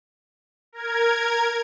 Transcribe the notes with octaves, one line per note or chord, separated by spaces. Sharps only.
A#4 G#6